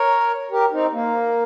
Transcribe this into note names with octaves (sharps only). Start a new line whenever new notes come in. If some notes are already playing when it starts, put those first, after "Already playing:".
Already playing: A#4 C#5
G4 A#4
C4 D#4
A#3